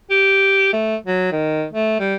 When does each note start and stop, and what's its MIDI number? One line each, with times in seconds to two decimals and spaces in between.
0.10 0.71 67
0.73 0.96 57
1.06 1.30 54
1.32 1.65 51
1.73 1.96 57
2.00 2.15 55